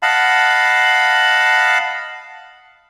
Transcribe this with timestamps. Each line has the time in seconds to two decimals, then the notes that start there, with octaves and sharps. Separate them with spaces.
0.03 D#5 F5 F#5 A5 B5